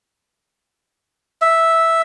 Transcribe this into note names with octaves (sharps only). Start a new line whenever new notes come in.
E5